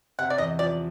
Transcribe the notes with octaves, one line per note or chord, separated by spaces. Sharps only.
C3 F#5
D5
E2 D#5
F3 D5